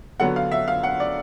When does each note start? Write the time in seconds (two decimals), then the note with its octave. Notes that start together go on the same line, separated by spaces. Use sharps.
0.20 D3 F#3 B3 F#5
0.36 F5
0.52 E5
0.68 F5
0.83 F#5
1.00 D5